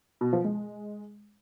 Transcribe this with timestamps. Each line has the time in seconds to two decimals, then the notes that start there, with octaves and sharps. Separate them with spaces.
0.21 B2
0.33 F3
0.44 G#3